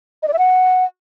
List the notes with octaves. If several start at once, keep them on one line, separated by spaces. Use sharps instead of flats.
D#5
D5
E5
F#5